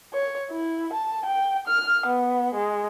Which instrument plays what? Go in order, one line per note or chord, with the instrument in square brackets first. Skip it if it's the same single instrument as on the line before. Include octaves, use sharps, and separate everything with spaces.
[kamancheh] C#5
E4
A5
G5
F6
B3
G#3